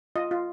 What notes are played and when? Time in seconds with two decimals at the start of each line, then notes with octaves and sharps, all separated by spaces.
0.16 F4 D#5
0.31 F4